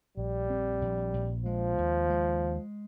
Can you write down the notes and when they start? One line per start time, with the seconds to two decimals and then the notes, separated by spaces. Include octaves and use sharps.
0.17 A#1 G3
0.50 C4
0.81 A#1
1.14 A#1
1.46 F3 G#3
1.78 D#2
2.10 G#3